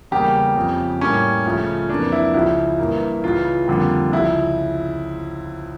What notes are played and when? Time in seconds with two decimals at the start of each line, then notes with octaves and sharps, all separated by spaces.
0.11 E2 C#3 G3 A#3 G4
0.56 F2 C#3 F3
1.01 A2 G3 A#3 C#4
1.45 C#2 C#3 F3 A3
1.89 F2 E3 A#3 D4
2.12 E4
2.34 C#2 C#3 F3 E4
2.79 G2 E3 A#3
3.23 C#2 C#3 E3 F4
3.68 F2 D3 G3 A#3
4.12 C#2 C#3 F3 E4